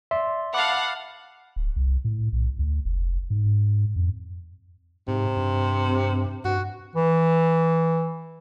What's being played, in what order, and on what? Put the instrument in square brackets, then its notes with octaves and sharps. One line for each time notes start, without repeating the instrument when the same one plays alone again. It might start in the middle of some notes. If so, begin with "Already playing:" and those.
[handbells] D5 C6 [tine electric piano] E5
[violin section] F5 F#5 A5 [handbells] B5 D6
[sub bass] D1
C2
A2
B1
D2
F1
G#2
F2
[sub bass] G#2 [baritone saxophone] C3
[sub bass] G2
[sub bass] G2 [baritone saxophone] F#4
[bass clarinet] E3